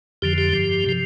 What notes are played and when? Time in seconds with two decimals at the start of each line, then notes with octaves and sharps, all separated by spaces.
0.22 F2 D3 F3 G4
0.38 G4
0.53 G2 F3
0.86 C3 F3